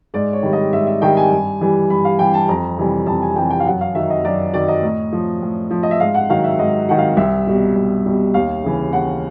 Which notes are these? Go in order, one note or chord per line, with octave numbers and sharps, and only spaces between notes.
G#2 D5
C#5
D#3 G3
D#5
G#2 E5
E5
D#3 G3 G5
G#5
G2
E3 G3
G2 B5
F5
E3 G3 G5
A5
F2 A#5
C3 E3 G3
F2 A5
G#5
C3 E3 G3 G5
G5
F5
F#2 F#5
F5
D#3 F#3 E5
D#5
F#2 D5
D#3 F#3 D5
D#5
A2
F3
A2
F3
D#5
E5
G#2 F5
F#5
D#3 F#3 F5
E5
G#2 D#5
D#3 F#3 F#5
F5
C2 E5
B2 G3
C2
B2 G3
D#2 F5
C#3 E3
D#2 F#5